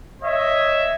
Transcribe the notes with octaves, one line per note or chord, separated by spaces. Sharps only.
C#5 D#5 E5